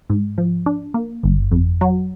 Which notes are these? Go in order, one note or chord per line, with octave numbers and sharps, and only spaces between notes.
G#2
F3
D4
A#3
G1
F2
F#3